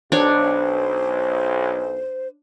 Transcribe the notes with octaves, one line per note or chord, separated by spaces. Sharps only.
B1 D4 C5 C#5